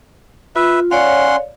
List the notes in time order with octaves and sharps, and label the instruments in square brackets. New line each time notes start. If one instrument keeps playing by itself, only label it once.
[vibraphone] F4 [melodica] B4 E5
[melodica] C#4 F#5 C6 [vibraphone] C#5 D5 F5